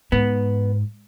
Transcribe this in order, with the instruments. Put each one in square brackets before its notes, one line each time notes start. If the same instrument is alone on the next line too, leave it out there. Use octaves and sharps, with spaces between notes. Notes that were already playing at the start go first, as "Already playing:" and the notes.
[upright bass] G#2 [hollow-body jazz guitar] B3